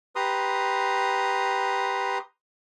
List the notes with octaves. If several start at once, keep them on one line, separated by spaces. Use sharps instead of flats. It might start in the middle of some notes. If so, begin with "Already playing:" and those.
G4 B4 A#5 C6 D#6